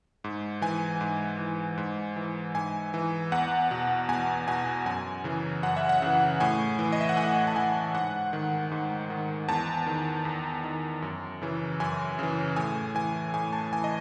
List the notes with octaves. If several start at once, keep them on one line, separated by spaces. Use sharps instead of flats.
G#2
E3 G#5
G#2
E3
G#2
E3
G#2 G#5
E3
E2 F#5
B2
E2 G#5
B2 G#5
F#2 G#5
C#3 E3
F#2 F#5
E5
F#5
C#3 E3
A2 G#5
E3
D#5
E5
F#5
A2 G#5
A5
E3 G#5
G#2 F#5
D#3
G#2
D#3
E2 A5
D#3
E2
D#3
F#2
C#3 E3
F#2 G#5
C#3 E3
A2 G#5
E3 G#5
A2 G#5
A5
E3 G#5
D#5